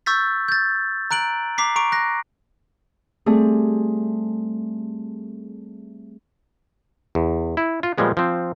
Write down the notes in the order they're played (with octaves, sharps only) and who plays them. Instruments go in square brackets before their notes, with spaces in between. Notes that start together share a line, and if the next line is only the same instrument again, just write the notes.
[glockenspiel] C#6 E6 G6 A6 B6
G6 A6
A#5 F#6 D7 F#7
A#5 D6 B6 C7
A#5 C#6 D7
F#6 A#6
[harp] G3 A3 C4 G#4
[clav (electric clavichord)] E2
E4
F4
A#2 F3 G3 G#3 B3
F3 C4